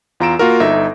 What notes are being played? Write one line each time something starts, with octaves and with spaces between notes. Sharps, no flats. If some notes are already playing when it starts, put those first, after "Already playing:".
E2 F4 A#5 E6 D7 E7
A#3 F4 F#4 A#4
G1 D#4 A4 E5 A#6